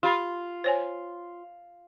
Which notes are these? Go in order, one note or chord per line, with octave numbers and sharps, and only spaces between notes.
F4 G4 B5 C6
C5 C#5 G#5